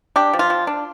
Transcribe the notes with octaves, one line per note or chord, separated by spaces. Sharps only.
D4 G4
F3
F4
F3
D4